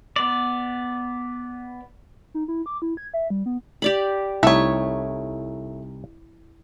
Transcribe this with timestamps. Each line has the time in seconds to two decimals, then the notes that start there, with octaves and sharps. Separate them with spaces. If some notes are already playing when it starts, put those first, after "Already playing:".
0.16 B3 D5
2.34 D#4
2.48 E4
2.66 D6
2.82 E4
2.97 G#6
3.14 E5
3.30 G3
3.46 B3
3.82 G4 D5 B5
4.43 C2 A3 D#4 E4 C#5